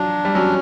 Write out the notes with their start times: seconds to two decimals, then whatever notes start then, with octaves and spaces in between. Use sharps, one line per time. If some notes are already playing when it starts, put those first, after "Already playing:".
Already playing: F3 F#3 D4
0.25 G3
0.35 F#3 C#4